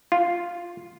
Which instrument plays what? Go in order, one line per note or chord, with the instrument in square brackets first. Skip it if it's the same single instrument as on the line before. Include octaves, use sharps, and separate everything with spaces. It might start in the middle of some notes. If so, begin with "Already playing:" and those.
[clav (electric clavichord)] F4